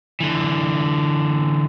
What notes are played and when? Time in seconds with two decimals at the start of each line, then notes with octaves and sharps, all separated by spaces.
0.20 D3 E3